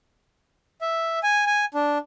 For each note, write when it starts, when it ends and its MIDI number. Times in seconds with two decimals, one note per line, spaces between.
0.81 1.19 76
1.23 1.46 80
1.46 1.65 80
1.74 1.98 62